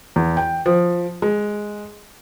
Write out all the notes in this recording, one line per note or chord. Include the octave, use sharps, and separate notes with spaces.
E2
G5
F3
G#3